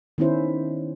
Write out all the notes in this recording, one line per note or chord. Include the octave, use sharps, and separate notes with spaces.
D#3 B3 C#4 E4 C5